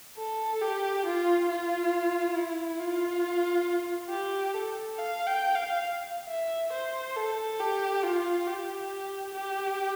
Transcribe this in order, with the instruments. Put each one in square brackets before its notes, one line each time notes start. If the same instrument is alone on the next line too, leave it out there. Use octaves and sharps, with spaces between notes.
[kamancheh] A4
G4
F4
F4
E4
F4
G4
A4
F5
G5
F5
E5
C5
A4
G4
F4
G4
G4